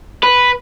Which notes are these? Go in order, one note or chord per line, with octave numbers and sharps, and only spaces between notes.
B4